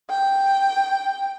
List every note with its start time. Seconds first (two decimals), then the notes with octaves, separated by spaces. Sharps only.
0.10 G5